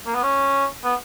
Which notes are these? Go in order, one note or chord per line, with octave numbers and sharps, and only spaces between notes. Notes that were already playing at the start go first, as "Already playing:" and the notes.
A#3
B3
C#4
B3